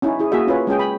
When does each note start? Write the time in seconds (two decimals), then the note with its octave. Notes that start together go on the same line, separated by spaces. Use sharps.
0.02 C#4 D#4 E4
0.19 E4 G#4
0.32 A#3 F#4 G#4 E5
0.47 C#4 F4 B4 C#5
0.67 G#3 C#4 G#4 G5
0.79 B5